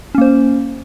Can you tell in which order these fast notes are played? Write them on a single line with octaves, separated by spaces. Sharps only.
C#4 A#3 C5